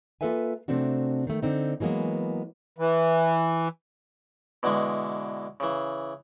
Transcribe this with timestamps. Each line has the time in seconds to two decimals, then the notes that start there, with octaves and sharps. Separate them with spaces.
0.21 A#3 F4 A4 B4 E5 G#5
0.68 C3 D#3 A3 C4 D4 F#4
1.27 D#3 A3
1.43 D3 C4 D#4
1.80 E3 F#3 G#3 A#3 B3
2.78 E3
4.63 B2 D3 E3 G#3
5.60 C#3 E3